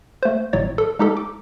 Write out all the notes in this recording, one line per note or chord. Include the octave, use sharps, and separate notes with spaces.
A3 C5
G#1 A2 F#3 C#5 A6
A4
G#3 D#4 G4 A4
D6